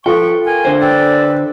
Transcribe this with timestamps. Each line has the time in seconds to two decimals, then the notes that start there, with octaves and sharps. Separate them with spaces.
0.06 F3 F4 A4 B4 G5 C#6
0.46 A#4 G5 G#5
0.65 D3 C5
0.82 A4 B4 D5 G5